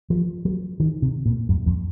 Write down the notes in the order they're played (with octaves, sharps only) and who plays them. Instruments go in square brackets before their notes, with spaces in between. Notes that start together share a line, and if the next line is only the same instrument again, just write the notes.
[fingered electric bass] F3
F#3
D#3
C3
A#2
F#2
F2